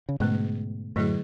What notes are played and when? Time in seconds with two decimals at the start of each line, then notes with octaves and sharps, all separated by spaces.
0.09 C#3
0.20 G#2 B2 D3 A3 C#4 G#4
0.96 F#2 A2 D3 F#3 A3 E4 G#4